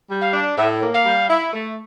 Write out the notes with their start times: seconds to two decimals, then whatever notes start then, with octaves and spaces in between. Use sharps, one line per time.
0.10 G3
0.21 F5
0.33 D4
0.57 A2 E5
0.82 A#3
0.94 F5
1.06 G3
1.30 E4
1.53 A3